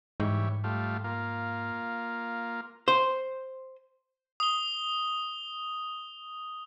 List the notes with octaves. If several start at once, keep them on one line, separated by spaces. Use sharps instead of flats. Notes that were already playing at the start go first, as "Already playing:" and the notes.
G#2 E3 G3 C#5
G3 A3 F4
A#3 F4
C5
D#6 G7